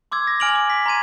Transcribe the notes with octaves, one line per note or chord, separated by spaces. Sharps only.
C6 D6 E6 G#6
A#6
G#5 F6 D7 F7 F#7
D6 D7
B6
A#5 C6 G#6 D#7